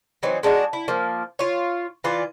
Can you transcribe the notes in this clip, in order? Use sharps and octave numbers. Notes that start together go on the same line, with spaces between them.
E3 F#3 C4 D#4
G#3 D4 D#4 F#4
E4
F3 A#3
F4 C#5
E3 F4 D5